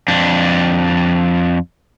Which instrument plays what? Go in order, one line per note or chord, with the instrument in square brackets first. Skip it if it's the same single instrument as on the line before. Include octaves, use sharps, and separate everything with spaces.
[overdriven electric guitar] F2 D4